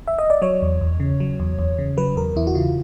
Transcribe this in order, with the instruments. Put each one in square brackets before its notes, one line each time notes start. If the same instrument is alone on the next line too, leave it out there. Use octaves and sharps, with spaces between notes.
[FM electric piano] E5
D#5
D5
F#3 C#5
E2
E2
C#3
F#3
E2
E2
C#3
F#3 B4
E2 A#4
E2 E4
F#4
C#3 F4